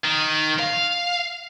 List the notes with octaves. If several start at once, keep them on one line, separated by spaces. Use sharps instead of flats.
D#3
F5